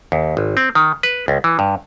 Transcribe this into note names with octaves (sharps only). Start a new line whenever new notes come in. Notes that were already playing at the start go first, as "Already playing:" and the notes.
D#2
G#1
C4
D#3
B4
C#2
E3
G2